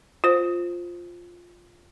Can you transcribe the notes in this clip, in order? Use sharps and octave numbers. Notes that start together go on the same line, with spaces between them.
F4 C5